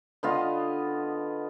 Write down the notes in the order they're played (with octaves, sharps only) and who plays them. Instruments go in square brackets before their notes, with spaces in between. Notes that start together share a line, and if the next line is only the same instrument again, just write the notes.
[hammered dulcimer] D3 B3 F4 D#5